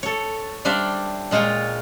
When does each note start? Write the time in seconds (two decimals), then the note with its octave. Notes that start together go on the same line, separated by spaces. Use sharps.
0.03 A4 C#5
0.65 G3 D4 C5 D5 E5 F5
1.31 A#2 G#3 F4 C#5 G5